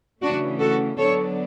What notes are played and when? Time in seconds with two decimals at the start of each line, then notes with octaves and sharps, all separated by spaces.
0.22 C#3 E3 A3 C#4 D4 F#4
0.59 F#4 A4
0.97 D3 F#3 B3 D4 A4 C#5